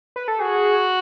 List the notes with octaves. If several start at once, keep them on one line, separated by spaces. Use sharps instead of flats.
B4
A4
F#4 G#4